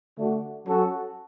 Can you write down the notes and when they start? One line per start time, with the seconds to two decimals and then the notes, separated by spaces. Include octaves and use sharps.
0.17 D3 A3 D4 F#4
0.65 F#3 C#4 F#4 A4